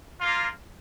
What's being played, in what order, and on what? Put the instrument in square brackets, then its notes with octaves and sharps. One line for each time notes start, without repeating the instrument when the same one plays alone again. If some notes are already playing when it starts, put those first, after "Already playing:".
[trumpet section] A#3 F4